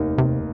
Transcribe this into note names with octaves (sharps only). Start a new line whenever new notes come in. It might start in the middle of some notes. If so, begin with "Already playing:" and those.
Already playing: F1 D#2 D#3 A#3 D#4
C3